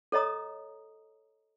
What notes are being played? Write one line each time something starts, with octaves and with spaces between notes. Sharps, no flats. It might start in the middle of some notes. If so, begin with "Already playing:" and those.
A4 C#5 D#5 A#5 D#6